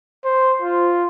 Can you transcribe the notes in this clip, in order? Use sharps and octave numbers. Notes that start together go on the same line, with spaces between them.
C5
F4